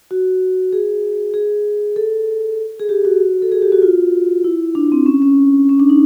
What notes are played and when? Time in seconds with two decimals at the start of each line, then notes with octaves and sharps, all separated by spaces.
0.11 F#4
0.73 G#4
1.34 G#4
1.96 A4
2.79 G#4
2.89 G4
3.05 F#4
3.42 A4
3.52 G#4
3.62 G4
3.72 F#4
3.82 F4
4.44 E4
4.75 D4
4.92 C4
5.06 C#4
5.22 C#4
5.69 C#4
5.80 D4
5.89 D#4